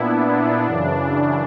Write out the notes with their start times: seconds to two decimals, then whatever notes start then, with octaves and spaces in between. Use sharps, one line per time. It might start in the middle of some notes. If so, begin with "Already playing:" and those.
Already playing: A#2 B3 D4 E4
0.28 B3
0.65 F#2 C#3 E3 D4